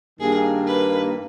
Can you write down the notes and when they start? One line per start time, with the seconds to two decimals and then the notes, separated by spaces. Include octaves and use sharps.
0.19 G2 D#3 A#3 G#4
0.67 B4